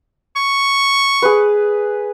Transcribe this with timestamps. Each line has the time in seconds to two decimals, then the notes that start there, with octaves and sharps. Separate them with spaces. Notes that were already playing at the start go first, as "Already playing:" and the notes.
0.36 C#6
1.22 G#4 B4